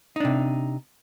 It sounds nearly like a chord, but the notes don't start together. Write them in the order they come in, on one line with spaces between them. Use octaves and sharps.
D#4 D4 C3